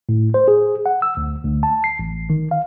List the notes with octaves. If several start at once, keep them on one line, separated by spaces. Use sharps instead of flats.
A2
C5
G#4
F#5
E6
D2
D2
A5
C7
A1
D#3
F5